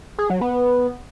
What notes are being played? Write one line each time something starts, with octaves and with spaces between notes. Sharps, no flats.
G#4
F#3
B3